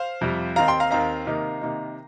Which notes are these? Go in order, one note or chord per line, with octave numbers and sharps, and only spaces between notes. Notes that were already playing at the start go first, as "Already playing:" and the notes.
Already playing: C5 F5
F2 C3 G3
D#2 D#3 C4 D#4 F5 A#5
G5 C6
F5 A#5
D#2 D#3 C4 D#4 F5 A#5
C3 D#3 A#3 D#4
C3 D#3 A#3 D#4